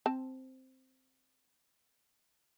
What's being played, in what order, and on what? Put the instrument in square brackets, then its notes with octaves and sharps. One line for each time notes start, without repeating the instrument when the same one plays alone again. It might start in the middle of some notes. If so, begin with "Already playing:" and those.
[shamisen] C4 A5